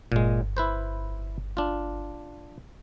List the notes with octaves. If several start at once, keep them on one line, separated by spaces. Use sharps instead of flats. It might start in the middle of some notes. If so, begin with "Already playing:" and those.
G1 A#2 G#3
E4 B4 C5
D4 F4